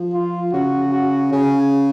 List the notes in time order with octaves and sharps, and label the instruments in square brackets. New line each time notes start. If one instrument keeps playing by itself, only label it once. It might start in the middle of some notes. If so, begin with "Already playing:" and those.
Already playing: [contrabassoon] F3
[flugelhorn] F4
[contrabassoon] C#3 [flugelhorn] F#4
[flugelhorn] F#4
[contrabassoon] C#3 [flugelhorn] G#4